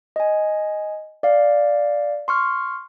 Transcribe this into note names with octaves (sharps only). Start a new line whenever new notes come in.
D#5 G#5
D5 F5
C6 C#6 F6